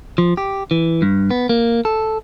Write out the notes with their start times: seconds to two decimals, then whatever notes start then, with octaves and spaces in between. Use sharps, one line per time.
0.18 F3
0.37 G4
0.71 E3
1.02 G2
1.31 B3
1.49 A#3
1.85 A4